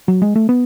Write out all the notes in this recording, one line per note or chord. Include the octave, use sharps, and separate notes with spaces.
F#3
G#3
A3
B3